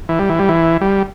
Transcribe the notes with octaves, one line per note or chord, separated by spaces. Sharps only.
E3
G3
E3
G3
E3
G3